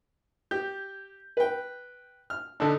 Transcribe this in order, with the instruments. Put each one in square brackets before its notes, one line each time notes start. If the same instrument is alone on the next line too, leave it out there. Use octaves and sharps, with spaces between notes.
[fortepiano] G4 [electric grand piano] G6
[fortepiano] B4 G5
F6
[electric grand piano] D3 D4 [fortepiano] D#4 A4